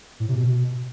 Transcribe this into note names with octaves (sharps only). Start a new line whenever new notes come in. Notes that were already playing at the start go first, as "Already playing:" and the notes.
A2
C3
B2